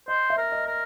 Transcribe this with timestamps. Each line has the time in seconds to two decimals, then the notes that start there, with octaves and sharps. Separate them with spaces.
0.08 C5 D#5
0.30 E5
0.38 A#4
0.52 D#5
0.67 A#4